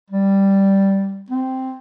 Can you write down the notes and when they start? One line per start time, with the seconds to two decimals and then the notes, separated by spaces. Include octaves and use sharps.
0.10 G3
1.31 C4